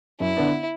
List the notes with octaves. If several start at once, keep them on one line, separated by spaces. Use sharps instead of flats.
F#2 E4
D3 B3 D4